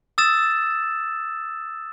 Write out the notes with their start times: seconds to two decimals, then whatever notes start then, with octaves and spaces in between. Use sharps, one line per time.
0.18 D#6 E6 A6 E7